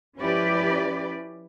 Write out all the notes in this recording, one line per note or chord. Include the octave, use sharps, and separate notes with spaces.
F3 C#4 E4 G4 B4 D5